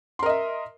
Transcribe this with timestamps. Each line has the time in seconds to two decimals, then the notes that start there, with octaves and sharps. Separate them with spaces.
0.19 C6
0.23 A#4
0.26 D#5
0.29 E5